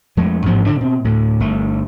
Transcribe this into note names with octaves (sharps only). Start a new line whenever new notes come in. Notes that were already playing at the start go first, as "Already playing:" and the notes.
F2 G#3 A3
A1 G#2 F3 B3
D3 D4
B2 C4
D2 A2
G1 A3